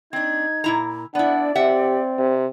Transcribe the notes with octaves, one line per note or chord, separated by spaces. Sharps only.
C4 D4 D#4 G#6
A#2 E4 A#5
B3 D4 E4 D5 F#5
C4 G4 E5 F#5
C3